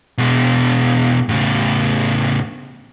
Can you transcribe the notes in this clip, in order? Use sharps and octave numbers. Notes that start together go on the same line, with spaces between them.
B2 G#3
A2 C#3